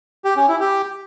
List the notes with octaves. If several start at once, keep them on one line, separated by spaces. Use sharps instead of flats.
G4
C#4
E4
G4